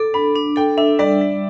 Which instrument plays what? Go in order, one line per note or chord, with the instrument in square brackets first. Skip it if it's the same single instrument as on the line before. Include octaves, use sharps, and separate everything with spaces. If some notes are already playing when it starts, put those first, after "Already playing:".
Already playing: [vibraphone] A4 [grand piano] D6
[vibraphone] D4 [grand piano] B5
[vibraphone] D4
[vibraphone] A4 [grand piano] G5
[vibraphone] D4 [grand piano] E5
[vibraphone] G3 [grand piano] D5
[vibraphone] G3